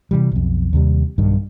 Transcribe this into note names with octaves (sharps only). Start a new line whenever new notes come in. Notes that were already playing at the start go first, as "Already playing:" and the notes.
C3 E3 G3
B1 F2
D#2 C3 G3
B1 G2 D#3